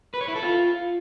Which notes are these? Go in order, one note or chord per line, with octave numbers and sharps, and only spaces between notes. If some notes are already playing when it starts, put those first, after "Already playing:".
B4
C#5
E4
A4
F4